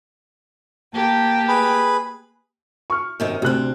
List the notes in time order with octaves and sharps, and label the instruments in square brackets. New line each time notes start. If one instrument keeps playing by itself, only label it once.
[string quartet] A#3 G4 A5
[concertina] G#4 B4 B5
[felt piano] C#6 F6
[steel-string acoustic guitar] F#2 C3 D#3
[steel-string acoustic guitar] D2 C4 [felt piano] C3 F#6